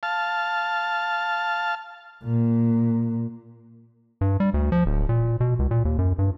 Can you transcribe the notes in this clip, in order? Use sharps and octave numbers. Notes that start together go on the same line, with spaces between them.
F5 A5
A#2
G2
G3
D2
F3
D1
A#2
B2
C#2
A#2
D#2
F#2
G2